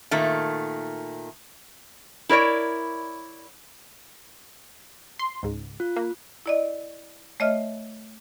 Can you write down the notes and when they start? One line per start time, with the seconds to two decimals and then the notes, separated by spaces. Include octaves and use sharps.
0.11 A#2 D#3 A3
2.29 E4 A#4 C#5 D5
5.19 C6
5.43 C#2 G#2
5.80 F4
5.96 A#3
6.46 E4 D5 D#5
7.40 A3 C#5 D#5 E5 F6